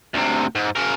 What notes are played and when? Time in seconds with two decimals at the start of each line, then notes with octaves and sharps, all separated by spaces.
0.14 D2 C3
0.56 G#2
0.76 C#3 A#4